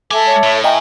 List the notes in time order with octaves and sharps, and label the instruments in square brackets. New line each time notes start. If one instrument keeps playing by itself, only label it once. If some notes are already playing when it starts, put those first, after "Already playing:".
[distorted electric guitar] G#3 G#5 [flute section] A4 E5 [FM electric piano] D6
[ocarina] C#5
[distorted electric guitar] A2
[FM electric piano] D#5 G5 A#5 [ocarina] E5 [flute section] G#5